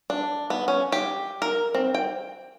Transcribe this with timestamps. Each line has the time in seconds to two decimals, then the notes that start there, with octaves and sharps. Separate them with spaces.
0.10 D4
0.50 B3
0.68 C#4
0.92 G4
1.42 A#4
1.74 C4
1.95 G5